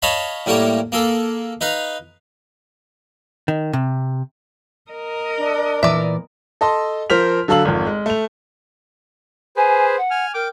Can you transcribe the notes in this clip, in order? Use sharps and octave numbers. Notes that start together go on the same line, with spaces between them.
C#5 D#5 F5 A5 B5
A2 G3 A#3 C#5
A#3 G#4 A4
D#4 B4 F5
D#3
C3
A#4 D#5
D4
A#2 E3 D5 E5
A4 D#5 A5 C6
F3 A#4 C5 F6 B6 F7
D3 F#3 A4 F5 E6 F#7
G#1 F2
G#3
A3 F7
G#4 B4 C5 G#5
F#5
G#5 F6
A#4 G5 D6